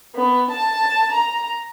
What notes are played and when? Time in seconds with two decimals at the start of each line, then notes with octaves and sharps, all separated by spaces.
0.13 B3
0.49 A5
1.11 A#5